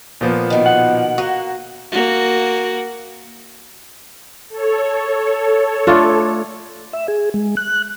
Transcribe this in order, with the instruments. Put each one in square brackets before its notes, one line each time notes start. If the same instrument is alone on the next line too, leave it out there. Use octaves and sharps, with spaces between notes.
[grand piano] A#2 F3 B3
[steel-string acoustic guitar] B2 D#3
[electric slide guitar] F#5
[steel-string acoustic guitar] A#3 [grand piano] F#4
[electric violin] A#3 F#4
[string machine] A4 C#5
[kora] A3 D4 F4
[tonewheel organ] E5
G#4
G#3
F#6